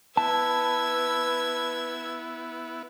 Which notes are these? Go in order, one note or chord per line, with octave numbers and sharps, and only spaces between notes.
B3 E4 B4 A5 E6 G#6